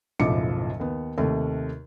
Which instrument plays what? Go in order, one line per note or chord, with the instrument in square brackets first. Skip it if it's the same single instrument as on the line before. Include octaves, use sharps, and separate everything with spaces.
[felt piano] F#1 B1 A2 F3 D6 C#7
D#2 B3
D#2 C3 A3